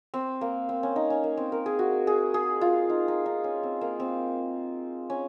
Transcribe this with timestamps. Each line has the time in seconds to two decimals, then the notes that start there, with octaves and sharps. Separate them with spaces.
0.14 C4
0.41 A#3
0.69 C4
0.83 C#4
0.96 D#4
1.10 C#4
1.24 A#3
1.37 C4
1.52 A#4
1.66 G#4
1.79 F#4
2.07 G#4
2.34 G#4
2.61 F4
2.89 D#4
3.08 D#4
3.26 D#4
3.44 C#4
3.63 C4
3.81 A#3
4.00 C4
5.10 C#4